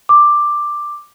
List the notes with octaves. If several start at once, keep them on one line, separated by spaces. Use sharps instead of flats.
D6